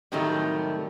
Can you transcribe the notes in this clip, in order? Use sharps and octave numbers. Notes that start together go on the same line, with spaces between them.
A2 C3 D#3 F#3 G3 A3